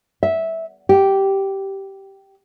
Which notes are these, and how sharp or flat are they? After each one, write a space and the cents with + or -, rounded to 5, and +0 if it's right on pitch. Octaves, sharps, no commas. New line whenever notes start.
E5 -10
G4 -10